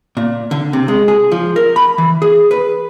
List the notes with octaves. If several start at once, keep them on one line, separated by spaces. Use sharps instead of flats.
A#2
D3
C3
G#3
G#4
F3
A#4
B5
E3
G#4
B4